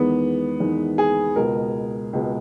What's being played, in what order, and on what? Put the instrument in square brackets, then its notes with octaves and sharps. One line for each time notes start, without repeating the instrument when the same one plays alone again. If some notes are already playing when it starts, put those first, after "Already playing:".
Already playing: [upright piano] E2 D#3 G#3 B3
E2 D#3 G#3
G#4
C#2 B2 G#3 A#4
C#2 B2 G#3